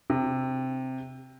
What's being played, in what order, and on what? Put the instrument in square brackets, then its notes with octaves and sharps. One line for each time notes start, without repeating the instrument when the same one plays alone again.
[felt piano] C3